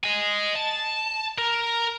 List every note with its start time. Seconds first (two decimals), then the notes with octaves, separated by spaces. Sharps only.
0.04 D#5 G#5
0.55 A5
1.38 A#4